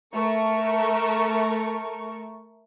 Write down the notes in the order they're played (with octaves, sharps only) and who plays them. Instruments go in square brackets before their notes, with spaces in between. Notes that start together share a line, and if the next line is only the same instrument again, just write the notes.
[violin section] A3 A#4 C#6